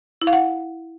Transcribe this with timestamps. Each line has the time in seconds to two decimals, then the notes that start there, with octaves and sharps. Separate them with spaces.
0.22 E4
0.27 F5
0.33 F#5